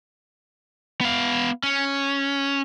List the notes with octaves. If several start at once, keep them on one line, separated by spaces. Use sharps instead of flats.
B3 F5
C#4